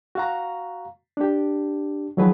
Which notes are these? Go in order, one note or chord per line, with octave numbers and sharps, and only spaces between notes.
F#4 F5 A#5
D4 G4
D#3 F3 F#3 G#4 B4